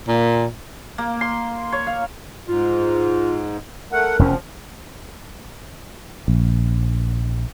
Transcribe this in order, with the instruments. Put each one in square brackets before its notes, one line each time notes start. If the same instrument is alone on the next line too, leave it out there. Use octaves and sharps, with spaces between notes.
[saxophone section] A#2
[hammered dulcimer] A#3
C6
C#5
F5
[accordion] G#2 [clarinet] F4
[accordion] A3 F#5 [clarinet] A#4
[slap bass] F1 E2 C#4 [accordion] F3
[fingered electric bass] A#1